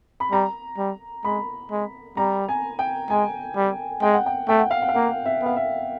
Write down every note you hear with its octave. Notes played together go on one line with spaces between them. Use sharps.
B5
G3 A#5
G3
G#3 B5
G#3
G3 A#5
G#5
G5
G#3 G#5
G3
G#3 G5
F#5
G5
A3 G5
F#5
F5
F#5
F5
A#3 F#5
E5
B3 F5
E5